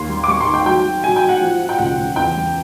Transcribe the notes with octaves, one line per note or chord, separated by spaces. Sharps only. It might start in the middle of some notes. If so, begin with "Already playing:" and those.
Already playing: D#2 C6
G3
D6
G3 C#6
C6
D#3
G5
F#3 G5
F#3
F#3 G#5
G5
F#3
F#5
F3
F3
G5
C#2 F#5
C#2
E2 G5
G3